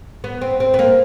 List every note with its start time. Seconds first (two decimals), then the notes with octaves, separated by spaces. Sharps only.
0.24 B3
0.41 C4
0.60 C4
0.74 B3
0.79 A#3